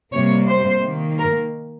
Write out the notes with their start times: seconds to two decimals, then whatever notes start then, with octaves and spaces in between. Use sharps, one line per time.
0.13 C3 G3 A#3 C#5
0.48 C5
0.83 D#3 A#3
1.18 A#4